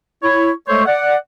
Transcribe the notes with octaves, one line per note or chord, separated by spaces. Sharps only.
E4 C#5
G#3 A3 A4 C5 C#5
D5 F#5